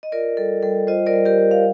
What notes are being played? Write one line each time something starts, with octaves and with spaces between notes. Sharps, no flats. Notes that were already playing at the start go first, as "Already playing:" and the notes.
D#5
F4 A#4 D5
G3 A4
G3 A4
F4 C5 D#5
A#4 D5
G3
G4 A#4
G3
F5